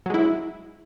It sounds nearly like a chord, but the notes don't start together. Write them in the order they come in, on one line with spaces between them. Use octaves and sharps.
F#3 G#3 E4